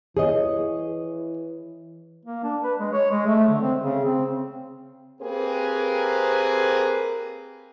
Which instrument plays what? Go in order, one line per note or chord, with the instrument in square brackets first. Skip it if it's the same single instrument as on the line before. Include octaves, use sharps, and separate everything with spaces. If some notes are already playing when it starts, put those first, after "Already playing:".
[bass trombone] E3 [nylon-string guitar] G#4 C#5 D#5
[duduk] A#3
D4
B4
G#3
C#5
G#3
A3
D3
C4
C#3
C4
[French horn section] A#3 C4 G4 G#4 A#4 B4